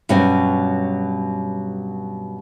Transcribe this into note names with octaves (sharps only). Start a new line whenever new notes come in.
G2 B2 F#3 G3 C#4